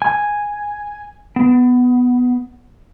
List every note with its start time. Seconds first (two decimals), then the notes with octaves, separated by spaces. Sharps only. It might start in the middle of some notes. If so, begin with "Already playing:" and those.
0.02 G#5
1.36 B3